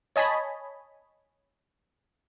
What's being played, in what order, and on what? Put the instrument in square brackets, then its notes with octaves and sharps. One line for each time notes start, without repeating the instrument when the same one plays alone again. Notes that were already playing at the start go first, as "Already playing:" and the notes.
[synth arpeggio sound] C#5 D#5 G#5 A5 B5